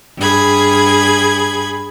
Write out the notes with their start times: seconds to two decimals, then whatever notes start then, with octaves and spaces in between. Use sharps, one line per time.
0.17 G2 G#4 B5 G#6